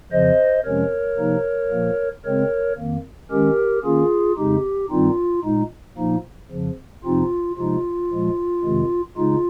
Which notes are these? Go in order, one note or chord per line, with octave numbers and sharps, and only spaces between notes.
F2 C#3 F3 C5 D#5
F2 C3 F3 G#3 C#4 A#4 C#5
C3 F3 A#3 D#4
A#2 F3 A#3
C#3 G#3 C4 A#4 C#5
F2 D#3 A#3
D#3 G#3 C#4 G4 A#4
D#3 A#3 C#4 F4 G#4
F2 C#3 G#3 D#4 G4
G2 D#3 G3 C4 D#4 F4
A#2 G#3 D#4
A#2 F3 A#3 D#4
F2 C#3 F3
F2 C3 F3 C4 D#4 F4
C3 F3 G#3 D#4 F4
A#2 F3 G#3
F2 C3 D#3 G#3
C#3 G#3 D#4 F4